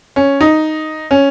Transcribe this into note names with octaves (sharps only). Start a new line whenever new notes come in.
C#4
D#4
C#4